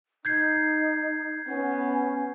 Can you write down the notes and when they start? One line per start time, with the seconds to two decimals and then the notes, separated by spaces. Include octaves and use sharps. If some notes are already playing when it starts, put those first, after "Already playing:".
0.25 D#4 G6 G#6 C7
1.47 B3 C#4